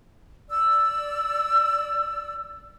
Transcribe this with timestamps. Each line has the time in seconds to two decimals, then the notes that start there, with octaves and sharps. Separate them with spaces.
0.49 D5 E6